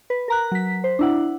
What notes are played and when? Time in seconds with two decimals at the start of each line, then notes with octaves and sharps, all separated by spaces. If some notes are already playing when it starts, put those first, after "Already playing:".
0.10 B4
0.28 A#4 A#5 F#6
0.52 F#3 B6
0.84 C5
0.99 D4 E4 F#5